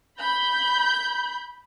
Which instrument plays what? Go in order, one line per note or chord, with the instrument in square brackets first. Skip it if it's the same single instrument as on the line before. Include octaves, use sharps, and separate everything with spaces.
[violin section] B5 G6